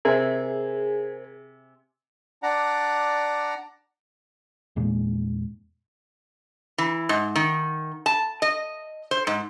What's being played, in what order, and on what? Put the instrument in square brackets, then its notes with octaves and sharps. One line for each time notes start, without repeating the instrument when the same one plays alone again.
[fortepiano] C3 E5 G#5 [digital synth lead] G#4 [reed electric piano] A#4 C5
[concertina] D4 D5 F#5 A#5
[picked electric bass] E2 A#2 G#3
[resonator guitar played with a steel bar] E3
G#2
D#3
A5
D#5
C5
G#2